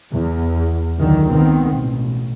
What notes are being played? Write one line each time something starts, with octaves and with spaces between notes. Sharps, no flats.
E2
C#2 F#2 D3 D#3
D#3 B3 C4
A1 B2